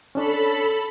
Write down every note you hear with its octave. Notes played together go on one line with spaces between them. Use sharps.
C#4 D4 A4 C#5 B5